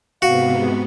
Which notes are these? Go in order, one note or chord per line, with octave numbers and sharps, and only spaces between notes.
G#2 C3 B3 F#4 F5